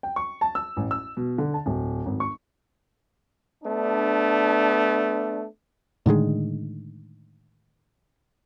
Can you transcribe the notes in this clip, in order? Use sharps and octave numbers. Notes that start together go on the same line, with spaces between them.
G5
C#6
A5
E6
A1
E6
B2
D3
A5
D1
G#1
C#6
A3 B3 D4
A2 D3 D#3 G#3